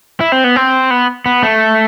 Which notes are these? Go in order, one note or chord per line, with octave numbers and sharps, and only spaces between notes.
E4
C4
B3
C4
B3
B3
A3